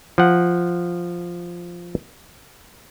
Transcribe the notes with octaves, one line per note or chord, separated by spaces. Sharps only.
F3 F#5